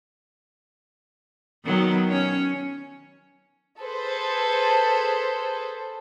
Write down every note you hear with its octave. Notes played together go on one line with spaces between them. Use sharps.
D#3 F#3 B3
C#4 C#5
G#4 A4 B4 C5